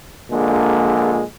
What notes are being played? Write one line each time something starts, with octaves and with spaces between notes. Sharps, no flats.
A#1 A#2 D3 G#3